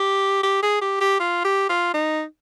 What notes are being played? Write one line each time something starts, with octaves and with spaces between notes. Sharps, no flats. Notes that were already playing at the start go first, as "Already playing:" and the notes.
Already playing: G4
G4
G#4
G4
G4
F4
G4
F4
D#4